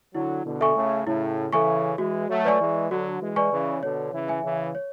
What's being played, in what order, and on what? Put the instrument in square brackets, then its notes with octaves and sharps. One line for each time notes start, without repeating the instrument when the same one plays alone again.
[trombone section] D3 F#3 [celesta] E4
[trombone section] B2 D3
[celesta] A4 E5 G#5 C#6
[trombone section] A2 C#3
[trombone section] A2 C#3 [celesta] E4
[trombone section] C#3 E3 [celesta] A4 E5 G#5 C#6
[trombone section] E3 G#3 [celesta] F#4
[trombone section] F#3 A3
[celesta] B4 D5 G#5 C#6
[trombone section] E3 G#3
[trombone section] D3 F#3 [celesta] F#4
[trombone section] E3 G#3
[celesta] B4 D5 G#5 C#6
[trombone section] C#3 E3
[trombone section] B2 D3 [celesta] C#5
[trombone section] C#3 E3
[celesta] E5 G#5
[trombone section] C#3 E3
[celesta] C#5